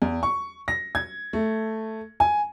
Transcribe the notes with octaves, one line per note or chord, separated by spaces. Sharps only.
E2
C#6
A#6
G#6
A3
G#5